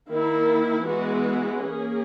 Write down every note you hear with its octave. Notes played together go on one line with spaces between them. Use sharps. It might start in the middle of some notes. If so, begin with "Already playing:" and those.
D#3 A#3 E4
E3 G#3 B3 F#4 B4
A#3 C#4 G#4